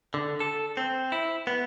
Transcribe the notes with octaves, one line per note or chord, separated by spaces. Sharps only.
D3
A4
C4
E4
B3